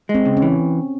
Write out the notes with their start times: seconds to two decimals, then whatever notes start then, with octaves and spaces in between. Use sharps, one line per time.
0.09 G#3
0.14 C4
0.25 C#3
0.37 C#4
0.42 E3